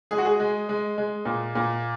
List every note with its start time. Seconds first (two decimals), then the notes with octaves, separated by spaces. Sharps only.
0.11 G#3 G#4
0.18 F#4
0.25 G#4
0.40 G#3
0.69 G#3
0.98 G#3
1.25 A#2
1.55 A#2